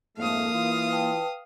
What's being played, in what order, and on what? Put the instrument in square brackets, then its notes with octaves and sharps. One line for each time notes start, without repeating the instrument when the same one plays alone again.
[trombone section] F2 G#2 A3 [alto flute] A#3 [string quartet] F5 D#6
[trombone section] E3 F4
[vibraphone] B4 G5 A5